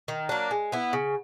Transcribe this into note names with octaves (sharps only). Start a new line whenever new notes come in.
D#3
F#3 A#3 D4
G#3
B3 E4
C#3